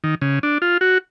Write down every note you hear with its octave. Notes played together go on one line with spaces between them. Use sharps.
D#3
C#3
D4
F4
F#4